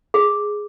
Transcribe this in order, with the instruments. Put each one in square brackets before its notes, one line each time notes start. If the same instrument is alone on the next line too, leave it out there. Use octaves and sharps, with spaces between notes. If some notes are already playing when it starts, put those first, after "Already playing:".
[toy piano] G#4